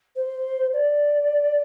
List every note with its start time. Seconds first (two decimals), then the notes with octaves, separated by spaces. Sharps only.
0.15 C5
0.73 D5